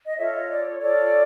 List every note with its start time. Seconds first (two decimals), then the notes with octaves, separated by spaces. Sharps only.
0.06 D#5
0.16 F4 A4 C#5 E5
0.32 D#5
0.49 D5
0.64 C#5
0.80 F4 A4 C#5 D5